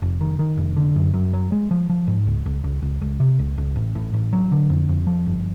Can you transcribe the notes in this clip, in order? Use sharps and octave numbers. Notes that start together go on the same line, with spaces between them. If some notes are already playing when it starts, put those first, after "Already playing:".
F1
D#3
D#3
F1
D3
F#2
F#2
F#3
G#3
F3
F3
G#2
C#2
C#2
C#2
C#2
C#2
C3
C#2
C#2
A1
A2
A1
F#3
D3
F2
F2
F3
G1